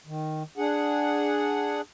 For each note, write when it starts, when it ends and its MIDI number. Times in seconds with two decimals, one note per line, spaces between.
0.06 0.43 51
0.57 1.81 62
0.57 1.81 68
0.57 1.81 78